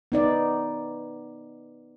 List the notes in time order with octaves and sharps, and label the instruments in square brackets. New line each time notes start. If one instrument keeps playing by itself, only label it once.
[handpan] B3 D#4 D5